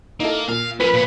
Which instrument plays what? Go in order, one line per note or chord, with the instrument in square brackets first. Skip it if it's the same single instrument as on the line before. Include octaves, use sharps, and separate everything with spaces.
[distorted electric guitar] A#3 [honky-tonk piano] D#4 E4 A4
[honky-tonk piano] A#2 [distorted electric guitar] F5
[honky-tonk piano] F3 A#3 D#7 [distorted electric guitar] C#4 A#4 [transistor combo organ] B4
[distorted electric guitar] A#2 C#5